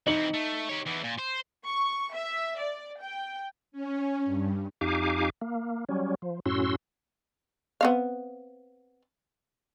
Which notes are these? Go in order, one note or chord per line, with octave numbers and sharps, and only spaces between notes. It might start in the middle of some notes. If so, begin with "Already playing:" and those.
E3 C4 D#4 C#7 F#7
A3
G4 C#5
E2 E3
A#2
C5
C#6
E5
D5
G5
C#4
G2
F2 D#4 G4 F5 G#5 D6
A#3
F#3 G3 C#4
F3
F#2 A2 C#4 F#4 C6 E6
B3 C4 F5